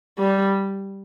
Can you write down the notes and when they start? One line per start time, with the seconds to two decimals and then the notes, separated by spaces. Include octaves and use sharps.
0.19 G3